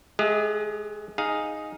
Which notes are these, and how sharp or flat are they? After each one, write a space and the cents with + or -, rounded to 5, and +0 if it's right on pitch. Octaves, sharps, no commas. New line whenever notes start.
G#3 +30 G#4 -40 E5 +45
D#4 +0 G#4 +0 F5 +5